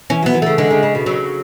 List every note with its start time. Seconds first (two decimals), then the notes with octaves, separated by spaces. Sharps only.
0.10 E3 C#4
0.23 F#3 B3
0.34 E3
0.42 C#3 A3
0.58 D3 G#3
0.70 C#3
0.83 C#3
0.95 B2
1.06 C#3 F#3